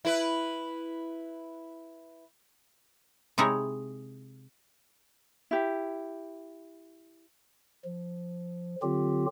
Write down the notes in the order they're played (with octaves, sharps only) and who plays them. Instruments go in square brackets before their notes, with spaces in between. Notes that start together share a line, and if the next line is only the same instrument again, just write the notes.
[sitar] E4 B4
[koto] C3 G#3 D#4 E4 C#5
[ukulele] E4 G4
[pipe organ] F3
D3 F#3 C4 F4 G4